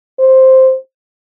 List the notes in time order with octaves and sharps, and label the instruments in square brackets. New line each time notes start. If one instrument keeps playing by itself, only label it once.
[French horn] C5